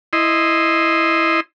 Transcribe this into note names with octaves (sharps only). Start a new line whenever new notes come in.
E4 D#5 C6